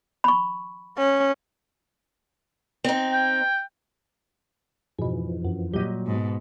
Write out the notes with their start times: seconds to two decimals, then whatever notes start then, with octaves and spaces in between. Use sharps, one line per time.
0.24 B5 C#6
0.98 C#4
2.84 C4 D#4
3.12 G5
4.99 F2 G#2 B2 E3 F3
5.45 F#2
5.73 A#2 F#3 G3 G4 D#5
6.07 G#2 B2